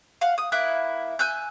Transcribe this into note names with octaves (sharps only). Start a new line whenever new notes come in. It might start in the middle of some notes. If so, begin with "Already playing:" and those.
F5 F#5
D#6
A#3 E4 F#6
G#5 E6 F#6 G6